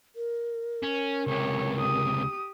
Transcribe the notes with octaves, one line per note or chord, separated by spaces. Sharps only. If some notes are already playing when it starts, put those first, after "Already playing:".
A#4
C#4
C#2 C3 C#5
G4 D#6